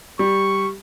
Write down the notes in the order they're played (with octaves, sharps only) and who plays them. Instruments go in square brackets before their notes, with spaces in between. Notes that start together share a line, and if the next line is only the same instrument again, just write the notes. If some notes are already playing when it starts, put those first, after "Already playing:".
[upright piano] G3 [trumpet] C#6